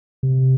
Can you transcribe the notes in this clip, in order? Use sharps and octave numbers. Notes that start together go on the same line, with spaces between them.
C3